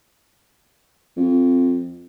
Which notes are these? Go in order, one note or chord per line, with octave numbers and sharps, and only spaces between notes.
F2